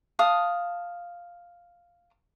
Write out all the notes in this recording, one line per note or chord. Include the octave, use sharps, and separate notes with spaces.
F5 A5 D#6